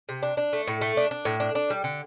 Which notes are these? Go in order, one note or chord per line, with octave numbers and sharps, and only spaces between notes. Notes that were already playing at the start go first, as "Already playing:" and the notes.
C3
D4
D4
A3
A2
A3
D4
D4
A2
D4
D4
G3
D3